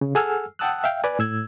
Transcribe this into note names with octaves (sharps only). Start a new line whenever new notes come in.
C#3
G#4 A4 F#5 G#5 E6 F6
F#5 G5 A5 D#6 E6 F#6
E5 F5 G5
B4 D5 G#5
A2 E6 G#6